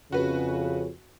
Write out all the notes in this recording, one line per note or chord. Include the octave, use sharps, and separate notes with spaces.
F2 C#3 F#4 B4